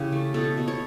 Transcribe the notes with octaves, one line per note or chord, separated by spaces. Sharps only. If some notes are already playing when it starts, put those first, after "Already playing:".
Already playing: C#3 E3 G4
A3
B2 A4
B2
C#5